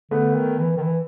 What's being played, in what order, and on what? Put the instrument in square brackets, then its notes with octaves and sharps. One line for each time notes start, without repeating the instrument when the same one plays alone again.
[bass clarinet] D3 [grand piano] A3 B3
[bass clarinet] D#3
E3
D#3
E3